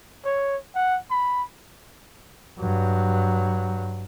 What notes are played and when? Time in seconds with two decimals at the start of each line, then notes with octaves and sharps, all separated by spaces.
0.25 C#5
0.75 F#5
1.11 B5
2.59 G2 F#3